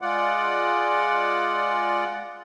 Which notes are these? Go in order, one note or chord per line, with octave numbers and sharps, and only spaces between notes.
G#3 F4 D5 F#5